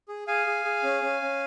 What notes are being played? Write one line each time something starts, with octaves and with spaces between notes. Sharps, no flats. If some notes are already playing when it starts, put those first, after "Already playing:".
G#4
G#4 F5 G#5
G#4
G#4
C#4
C#4
C#4